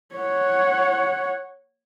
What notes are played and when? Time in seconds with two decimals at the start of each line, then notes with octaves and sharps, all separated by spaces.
0.15 C#5 F#5